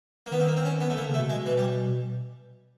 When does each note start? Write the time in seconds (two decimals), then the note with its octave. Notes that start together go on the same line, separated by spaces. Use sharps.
0.26 A#3
0.31 D#3 B3
0.40 C4
0.48 A#3
0.57 C4
0.65 C#4
0.80 B3
0.90 A3
0.97 D3 A#3
1.09 C#3
1.14 A3
1.19 B2
1.30 G#3
1.46 E3
1.58 G3